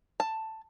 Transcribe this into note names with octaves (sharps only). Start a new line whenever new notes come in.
A5